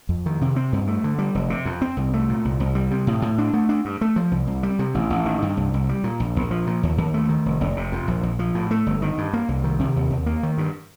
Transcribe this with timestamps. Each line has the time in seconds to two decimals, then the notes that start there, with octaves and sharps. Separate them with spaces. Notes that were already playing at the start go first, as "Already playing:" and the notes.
0.09 F2
0.26 D#3
0.41 C3
0.56 C4
0.72 G2
0.87 A3
1.04 D3
1.18 G3
1.35 F1
1.50 C3
1.65 F2
1.82 C4
1.97 C2
2.13 A3
2.29 A#2
2.45 C2
2.60 C2
2.75 G3
2.91 C3
3.07 A2
3.22 A2
3.38 D4
3.53 A3
3.69 D4
3.85 G2
4.01 A3
4.16 F3
4.31 C2
4.47 C2
4.63 G3
4.79 C3
4.94 A1
5.10 A1
5.26 D#3
5.42 G2
5.57 C2
5.74 C2
5.89 G3
6.04 A#2
6.20 A#1
6.36 A#1
6.51 F3
6.67 A#2
6.83 D#2
6.98 D#2
7.14 A3
7.29 D#3
7.46 F1
7.61 F1
7.77 C3
7.92 F2
8.08 A#1
8.23 A#1
8.39 F3
8.55 A2
8.71 A3
8.86 G1
9.02 D#3
9.18 G2
9.33 A#3
9.48 C2
9.64 D#3
9.79 C3
9.96 D#2
10.11 D#2
10.26 A#3
10.43 D#3
10.58 G2